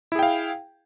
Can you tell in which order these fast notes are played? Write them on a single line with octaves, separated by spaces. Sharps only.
E4 G#4 G5 F5